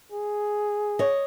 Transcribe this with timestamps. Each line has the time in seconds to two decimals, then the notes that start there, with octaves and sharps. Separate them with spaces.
0.12 G#4
0.99 C#5 D#5